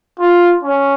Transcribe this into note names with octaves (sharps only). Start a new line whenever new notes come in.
F4
C#4